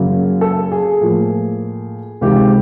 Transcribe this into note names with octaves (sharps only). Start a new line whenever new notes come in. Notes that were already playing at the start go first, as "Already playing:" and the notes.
Already playing: F#2 C#3 F#3 A#3
A4
G#4
A2 F3 A#3
C#2 C3 D#3 G#3 G4